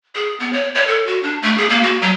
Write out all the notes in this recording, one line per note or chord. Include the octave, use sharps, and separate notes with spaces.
G#4
B3
C#5
C#5
A4
F#4
D4
A3
G#4
A#3
F#4
F#3